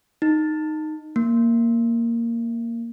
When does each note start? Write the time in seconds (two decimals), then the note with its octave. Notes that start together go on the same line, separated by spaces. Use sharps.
0.22 D#4
1.16 A#3